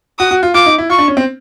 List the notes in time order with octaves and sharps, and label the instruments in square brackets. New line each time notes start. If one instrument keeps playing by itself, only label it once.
[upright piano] F#4 [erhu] D#6
[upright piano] F#4
F4
[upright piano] F4 [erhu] D6
[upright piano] D#4
E4
[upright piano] F4 [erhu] C#6
[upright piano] D4
C#4
C4